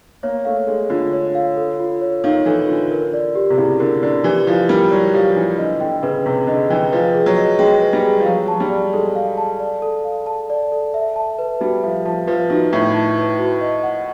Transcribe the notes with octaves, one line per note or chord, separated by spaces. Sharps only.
A#3 C#5
A3 F5
G#3 A4
D3 F4
C#5
F5
A4
F4
C#5
D#3 F5
E3 A4
D3 F4
A#4
D5
G4
C3
C#3 E4
D3 A#4
D3 D5
E3 G4
F3 E4
G3 A#4
F#3 D5
F3 G4
E3 E4
D3 D#5
D3 G5
C#3 B4
C3 G#4
D3 D#5
E3 G5
F3 B4
G#4
F#3
D#5
G#3 G5
B4
G3
G#4
F3
F#3 F5
F#3 A5
G3
D5
G#3 A4
F5
A5
D5
A4
F5
A5
D5
A4
E5
A5
B4
G3 F#4
F3 E5
F3 A5
F3 B4
D#3 F#4
A2 E5
A5
B4
F#4
D#5
F#5